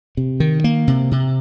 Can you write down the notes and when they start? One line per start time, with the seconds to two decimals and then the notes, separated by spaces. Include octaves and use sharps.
0.17 C3
0.40 D#3
0.64 A#3
0.88 C3
1.11 C3